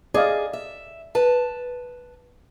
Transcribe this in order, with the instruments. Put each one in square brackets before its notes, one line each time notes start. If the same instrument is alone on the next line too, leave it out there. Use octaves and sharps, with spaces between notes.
[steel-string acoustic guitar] G#4 [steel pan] D5 D#5 F5
[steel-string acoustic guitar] E5
B4 A5